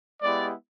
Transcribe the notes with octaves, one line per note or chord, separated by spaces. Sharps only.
G#3 B3 E4 G4 D5